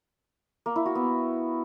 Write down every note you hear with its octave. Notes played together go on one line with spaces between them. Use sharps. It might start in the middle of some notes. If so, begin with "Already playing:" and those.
A#3
E4
F#4
B3